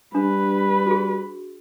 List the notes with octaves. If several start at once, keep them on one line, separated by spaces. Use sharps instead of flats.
G3 D4 B4
F#4 G#4